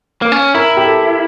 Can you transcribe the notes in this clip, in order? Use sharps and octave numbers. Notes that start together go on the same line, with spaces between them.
A#3
C#4
E4 A#4
G4
A4